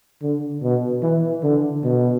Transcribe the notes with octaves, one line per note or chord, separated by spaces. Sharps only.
D3
B2
E3
D3
B2